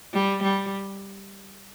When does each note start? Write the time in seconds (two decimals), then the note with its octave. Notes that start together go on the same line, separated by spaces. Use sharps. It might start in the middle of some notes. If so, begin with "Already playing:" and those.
0.13 G3
0.43 G3